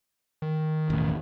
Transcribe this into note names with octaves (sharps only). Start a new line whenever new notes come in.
D#3
E1 A1